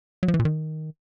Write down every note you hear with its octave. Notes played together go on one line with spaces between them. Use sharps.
F#3
F3
E3
A#2
D#3